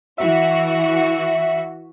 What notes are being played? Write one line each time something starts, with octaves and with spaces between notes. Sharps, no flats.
E3 F#4 E5